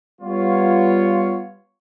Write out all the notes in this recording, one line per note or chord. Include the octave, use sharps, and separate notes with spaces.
G3 B3 F4 C#5